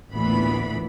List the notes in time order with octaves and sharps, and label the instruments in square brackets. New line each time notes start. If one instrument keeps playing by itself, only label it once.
[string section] A1 D2 A#2 E3 B3 B5